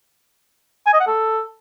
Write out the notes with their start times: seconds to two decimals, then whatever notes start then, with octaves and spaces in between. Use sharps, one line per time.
0.87 G#5
0.93 D#5
1.00 F#5
1.07 A4